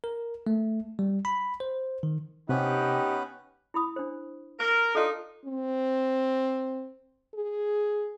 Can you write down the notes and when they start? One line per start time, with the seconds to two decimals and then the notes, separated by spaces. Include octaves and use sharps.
0.04 A#4
0.47 A3
0.99 G3
1.25 B5
1.60 C5
2.03 D#3
2.49 C3 B3 C#4 D#4 G4 B4
3.74 E4 B5 D#6
3.96 D4 C5
4.60 A#4
4.95 D4 D#4 F4 A4
5.45 C4
7.34 G#4